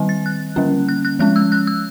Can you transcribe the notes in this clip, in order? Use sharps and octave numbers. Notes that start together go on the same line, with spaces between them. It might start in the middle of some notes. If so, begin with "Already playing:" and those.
Already playing: D#3 G3 C4
A6
F#6
D3 G3 A#3 C#4
F#6
F#6
F3 G#3 C#4 F#6
E6
F#6
E6